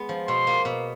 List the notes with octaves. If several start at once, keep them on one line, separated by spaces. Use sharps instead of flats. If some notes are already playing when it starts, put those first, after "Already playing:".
Already playing: G#3 B3
F3
B2 C6
A#3
B2